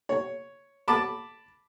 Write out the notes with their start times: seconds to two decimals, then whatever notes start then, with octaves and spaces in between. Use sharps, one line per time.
0.09 C#5
0.88 A5 B5 D6